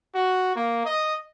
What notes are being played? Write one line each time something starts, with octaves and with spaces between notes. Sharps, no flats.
F#4
A#3
D#5